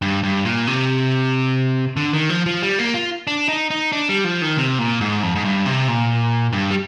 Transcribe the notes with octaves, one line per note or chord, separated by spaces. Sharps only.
G2
G2
A#2
C3
D3
D#3
F3
F3
G3
A#3
F4
D4
D#4
D#4
D4
G3
F3
D#3
C3
A#2
G#2
F2
G#2
G2
C3
A#2
G2
G3